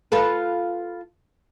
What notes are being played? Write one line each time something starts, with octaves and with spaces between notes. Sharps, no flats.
F4 A4 B4